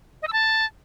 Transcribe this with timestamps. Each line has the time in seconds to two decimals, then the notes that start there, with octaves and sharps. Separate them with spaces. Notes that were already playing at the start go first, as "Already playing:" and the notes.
0.22 D#5
0.28 E6
0.33 A5